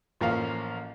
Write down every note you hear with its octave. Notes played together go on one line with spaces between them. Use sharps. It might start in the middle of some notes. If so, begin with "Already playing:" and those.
A1 F3 A#3 C#4 F5